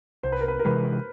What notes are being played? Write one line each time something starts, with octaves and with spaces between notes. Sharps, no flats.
C2 C5
B4
A#4
B4
A#4
C3 E3 G#3 B4